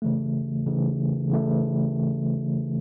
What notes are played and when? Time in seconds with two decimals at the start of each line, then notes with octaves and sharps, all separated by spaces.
0.02 C#3 E3 A3
0.66 C#3 E3 A3
1.30 C#3 E3 A3